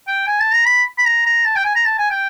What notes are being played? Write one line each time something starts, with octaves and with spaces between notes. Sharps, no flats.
G5
G#5
A5
A#5
B5
B5
A#5
A#5
A5
G5
G#5
A#5
A5
G#5
G5